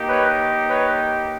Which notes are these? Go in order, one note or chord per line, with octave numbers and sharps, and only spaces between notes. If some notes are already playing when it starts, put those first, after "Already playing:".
Already playing: A#3 D#4 G4
B4 C#5
B4 C#5